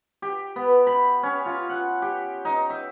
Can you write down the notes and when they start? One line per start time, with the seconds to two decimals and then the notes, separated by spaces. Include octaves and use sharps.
0.22 G4
0.56 B3
0.87 B5
1.23 C#4
1.46 F4
1.69 F#5
2.02 G4
2.45 D#4
2.70 E5